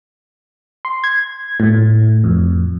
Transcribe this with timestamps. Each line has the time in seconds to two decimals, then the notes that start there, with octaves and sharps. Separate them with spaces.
0.85 C6
1.04 G#6
1.60 A2
2.24 F2